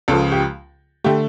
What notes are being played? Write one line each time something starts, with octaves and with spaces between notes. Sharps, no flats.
C#2 C#3 F3 A4
G4
D3 A3 G4